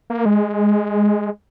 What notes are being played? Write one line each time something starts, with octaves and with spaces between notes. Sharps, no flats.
A#3
G#3